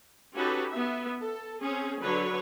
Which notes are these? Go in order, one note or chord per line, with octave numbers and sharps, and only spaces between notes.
C#4 D#4 F#4 G4 A4 B4
B3 E5
A4
C4 C#4 G#4
D3 F#3 B4 C#5